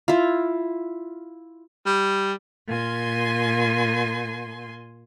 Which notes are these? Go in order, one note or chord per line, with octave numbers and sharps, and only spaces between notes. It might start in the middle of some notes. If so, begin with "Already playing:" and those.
E4 F4
G3
A#2 G#5 C6